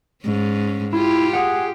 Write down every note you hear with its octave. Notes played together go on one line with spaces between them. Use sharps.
G#2 C#4
E4 F4 G4
G#4 F#5